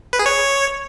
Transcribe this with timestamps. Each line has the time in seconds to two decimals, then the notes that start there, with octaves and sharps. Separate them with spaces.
0.13 B4
0.19 G#4
0.26 C#5